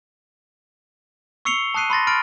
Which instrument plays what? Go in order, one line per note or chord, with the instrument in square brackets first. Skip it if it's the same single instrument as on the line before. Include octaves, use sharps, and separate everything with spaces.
[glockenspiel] C#6 E6 C7 C#7 F7 G7
A5 D#6 F#6 C7 D#7
B5 C6 A6 A#6
B5 F6 A6 D7